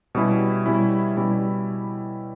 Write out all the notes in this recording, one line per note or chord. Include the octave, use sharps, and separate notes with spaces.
B2 G3 C#4 E4
B2 G3 C#4 E4
B2 G3 C#4 E4